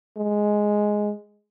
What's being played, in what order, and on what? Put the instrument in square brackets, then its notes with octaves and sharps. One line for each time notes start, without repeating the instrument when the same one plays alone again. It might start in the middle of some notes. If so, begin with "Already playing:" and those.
[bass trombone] G#3